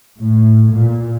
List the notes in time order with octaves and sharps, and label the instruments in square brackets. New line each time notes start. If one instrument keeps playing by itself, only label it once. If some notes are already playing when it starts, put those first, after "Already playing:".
[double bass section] A2
A#2